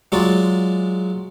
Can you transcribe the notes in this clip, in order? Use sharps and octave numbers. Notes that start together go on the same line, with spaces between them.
F#3 G#3 F4 D5